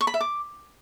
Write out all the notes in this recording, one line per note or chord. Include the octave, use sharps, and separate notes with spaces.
C#6
B5
E5
D6